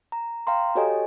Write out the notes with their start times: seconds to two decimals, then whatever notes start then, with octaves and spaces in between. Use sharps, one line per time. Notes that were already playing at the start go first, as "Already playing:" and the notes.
0.12 A#5
0.47 F5 G5 A#5 C6
0.75 F#4 G4 A4 C#5 D#5 G#5